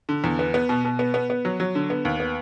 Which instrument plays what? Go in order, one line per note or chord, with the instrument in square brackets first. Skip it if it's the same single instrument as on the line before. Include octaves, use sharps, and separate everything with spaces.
[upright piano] D3
E2
B3
B3
B2
B2
B3
B3
B3
F#3
F#3
D3
B3
D#2
B3